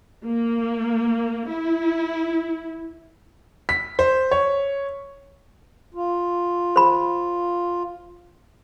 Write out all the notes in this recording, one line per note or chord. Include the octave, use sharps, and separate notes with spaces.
A#3
E4
B6
C5
C#5
F4
C5 B5